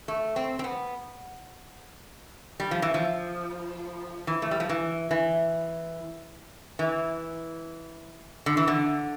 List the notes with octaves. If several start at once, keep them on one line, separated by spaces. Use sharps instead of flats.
A3
C4
C4
B3
G3
F3
E3
F3
E3
A3
G3
F3
E3
E3
E3
D3
E3
D3